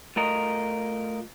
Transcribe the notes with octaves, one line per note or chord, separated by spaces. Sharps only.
A3 F4 A#4 D#5